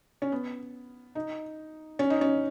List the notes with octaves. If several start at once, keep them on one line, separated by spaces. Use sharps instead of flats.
C#4
B3
D#4
C#4
D#4
C#4